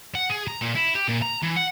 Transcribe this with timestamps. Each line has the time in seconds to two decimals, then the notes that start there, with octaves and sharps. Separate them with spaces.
0.15 F#5
0.30 G#4
0.48 A#5
0.62 A#2
0.75 E4
0.95 G4
1.08 A#2
1.22 A#5
1.42 E3
1.56 F#5